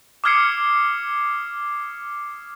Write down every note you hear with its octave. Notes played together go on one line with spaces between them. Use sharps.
D6 D#6 F6 G#6 C7 C#7